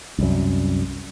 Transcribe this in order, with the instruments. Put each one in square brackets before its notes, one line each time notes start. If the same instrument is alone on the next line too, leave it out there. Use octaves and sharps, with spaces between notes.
[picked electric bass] C2 F#2